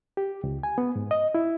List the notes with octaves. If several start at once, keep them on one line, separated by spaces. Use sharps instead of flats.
G4
C#2
G#5
B3
G#2
D#5
E4